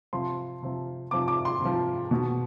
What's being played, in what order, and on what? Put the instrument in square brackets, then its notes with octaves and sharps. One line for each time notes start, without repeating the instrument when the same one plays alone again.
[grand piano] C3 F3 C6
C3 F3
C3 F3 D6
D6
C6
C3 F3
B2